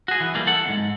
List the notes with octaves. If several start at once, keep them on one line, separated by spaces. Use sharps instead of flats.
F#4 G#4
E3
E3 G3 A#3 G#4
A4 F#5
E2 G#2